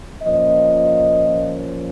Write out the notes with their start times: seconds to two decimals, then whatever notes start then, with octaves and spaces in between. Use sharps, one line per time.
0.23 A#2 F3 A#3 C#4 D#5